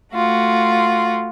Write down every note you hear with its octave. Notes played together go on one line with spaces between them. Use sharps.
A3 F4 F#4